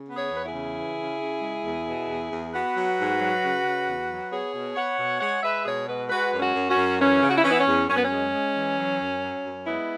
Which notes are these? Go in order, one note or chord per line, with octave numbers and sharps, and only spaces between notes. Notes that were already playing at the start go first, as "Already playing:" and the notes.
Already playing: C#3
B3
G#4 C#5
E2 B4
E4 G#4
C#3
E3
C#3
C#3
G#3
E2
B2
E2
E2
B3 F#4 B4
F#3
G#2
F#3
C#3
C#3
E2
F#3
B3 G#4 C#5
B2
B3 C#5 F#5
B2
G#3 C#5 F#5
G#3 B4 E5
B2 G#4 C#5
G#3 F#4 B4
G#3 F#4 B4
F#2
C#4 F#4
F#2
C#4 F#4
F#2
E3 C#4
C#3
F#4
E4
E3 C#4
B3 E4
C#4
E2
F#2 C#4
B3
C#4
G#3
G#3
E3
F#3
F#2
F#3
F#2
G#3 B3 E4